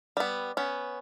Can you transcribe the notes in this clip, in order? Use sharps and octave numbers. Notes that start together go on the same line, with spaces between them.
G3 B3
B3 C#4